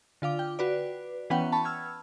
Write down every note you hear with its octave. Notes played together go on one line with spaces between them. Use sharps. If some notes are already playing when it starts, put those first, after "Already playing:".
D3 F4 F5 D6
G5
F#4 B4 D5
E3 B3 C#4 B4 F#5 G5
A5 B5 C#6
E6 F6 G#6